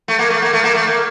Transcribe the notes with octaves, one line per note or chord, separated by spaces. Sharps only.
A3
A#3
A3
A#3
A3
A#3
A3
A#3